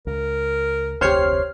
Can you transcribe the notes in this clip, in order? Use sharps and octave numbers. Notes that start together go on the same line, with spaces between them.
C#2 A#4
F1 D2 C4 G4 C5 C#5 F6 C7